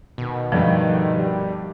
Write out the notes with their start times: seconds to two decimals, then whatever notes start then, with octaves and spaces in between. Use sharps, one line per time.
0.18 B2 D#3
0.52 G2 D3 D#3 F3 A3
1.15 G3